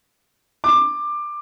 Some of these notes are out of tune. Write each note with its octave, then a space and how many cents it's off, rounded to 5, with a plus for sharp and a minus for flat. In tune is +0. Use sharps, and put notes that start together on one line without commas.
D6 +15